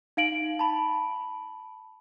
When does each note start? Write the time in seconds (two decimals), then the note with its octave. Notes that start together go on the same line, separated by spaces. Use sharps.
0.17 D#4 F5 D7 F#7
0.59 A5 B5